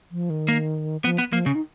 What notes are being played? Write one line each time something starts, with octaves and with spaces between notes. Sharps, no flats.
F3
D#3
A#3
F3 B3
B3
F3 A#3
C#3 C#4
D#4